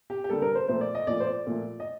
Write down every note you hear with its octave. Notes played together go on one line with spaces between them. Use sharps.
G4
G4
D3 G3 A#3 A4
A#4
C5
A#2 F3 A3 C5
D5
D#5
A#2 F3 A3 D5
C5
D5
A#2 F3 A3
D#5